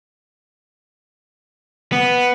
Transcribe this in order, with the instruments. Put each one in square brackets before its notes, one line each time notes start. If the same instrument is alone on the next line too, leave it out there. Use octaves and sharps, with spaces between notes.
[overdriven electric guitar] B3